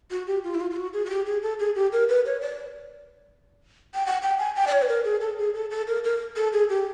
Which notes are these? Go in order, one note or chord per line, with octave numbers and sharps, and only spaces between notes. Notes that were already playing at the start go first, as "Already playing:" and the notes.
F#4
G4
F4
E4
F4
F4
F#4
G#4
F#4
G4
G#4
A4
G#4
G4
A#4
B4
C#5
D5
G5
F#5
G5
G#5
G5
D5
C#5
B4
A#4
G#4
A4
G#4
A4
A4
A#4
A#4
A4
G#4
G4